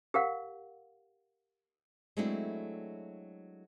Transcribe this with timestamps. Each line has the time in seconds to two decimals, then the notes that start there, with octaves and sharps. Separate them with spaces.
0.14 G4 A#4 F5 F#5
2.17 F#3 G#3 A3 C4 D4 E4